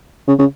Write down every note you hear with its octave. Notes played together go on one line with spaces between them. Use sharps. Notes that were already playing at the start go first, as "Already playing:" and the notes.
C#3
C#3